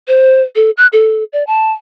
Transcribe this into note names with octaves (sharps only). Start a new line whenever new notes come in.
C5
A4
F#6
A4
D5
A5